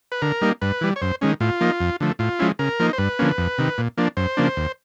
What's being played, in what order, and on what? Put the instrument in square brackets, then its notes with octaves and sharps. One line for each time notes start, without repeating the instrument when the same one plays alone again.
[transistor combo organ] B4
D3 A#4
G3 A#3 D#4
G2 B4
E3 G3
C#5
F#2 C5
D#3 G#3 C#4
A2 F4
F3 A#3 D#4
F2
D3 F3 A3
A2 F4
F3 G#3 C#4 E4
C#3 A#4
F3 A#3 D#4
C5
G2 B4
D3 F3 A#3 C#4
F2
C3 D#3
A#2
F3 A#3 D4
F#2 C5
C#3 F3 A#3 D4
D#2